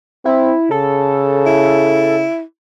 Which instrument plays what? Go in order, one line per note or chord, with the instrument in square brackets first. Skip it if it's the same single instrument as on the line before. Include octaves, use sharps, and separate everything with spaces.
[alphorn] C4 [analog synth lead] E4
[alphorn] C#3 [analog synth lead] A4
[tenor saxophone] E4